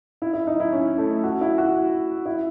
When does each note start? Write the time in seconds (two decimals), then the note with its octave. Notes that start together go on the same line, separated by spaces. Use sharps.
0.22 E4
0.33 E4
0.47 D#4
0.60 E4
0.73 C#4
0.98 A3
1.24 F#4
1.41 E4
1.58 F#4
2.26 E4